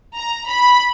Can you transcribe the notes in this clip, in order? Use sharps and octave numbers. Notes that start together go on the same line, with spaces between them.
A#5
B5